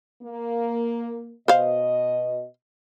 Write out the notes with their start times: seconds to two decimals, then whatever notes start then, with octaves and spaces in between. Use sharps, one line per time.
0.23 A#3
1.48 B2 C5 D#5 F5